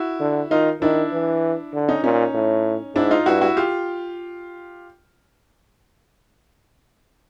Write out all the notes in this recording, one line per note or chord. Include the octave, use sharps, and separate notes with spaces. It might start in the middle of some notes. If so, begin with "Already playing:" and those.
Already playing: E4 F#4
D3
D#3 D#4 F4
D#3 D4 E4
E3
D3
C#4 D#4
A#2 C#4 D#4
A2
G#2 D4 E4
D#4 F4
G2 E4 F#4
E4 F#4
F4 G4